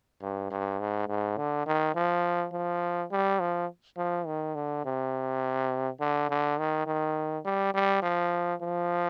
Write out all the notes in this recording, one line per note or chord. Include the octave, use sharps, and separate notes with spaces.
G2
G2
G#2
G#2
D3
D#3
F3
F3
G3
F3
F3
D#3
D3
C3
D3
D3
D#3
D#3
G3
G3
F3
F3